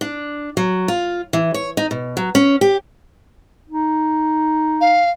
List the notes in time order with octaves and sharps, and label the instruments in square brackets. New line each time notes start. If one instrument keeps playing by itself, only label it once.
[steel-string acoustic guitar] D4
F#3
F4
E3
C#5
D#4
B2
F#3
C#4
G4
[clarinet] D#4
[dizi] F5